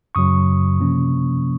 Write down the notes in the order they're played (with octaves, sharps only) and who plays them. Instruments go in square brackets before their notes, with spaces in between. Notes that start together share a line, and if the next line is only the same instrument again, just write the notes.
[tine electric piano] F#2 C#3 F#3 C#6 D#6
C3 F3 A#3 C#4